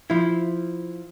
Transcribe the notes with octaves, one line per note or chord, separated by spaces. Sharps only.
F3 E4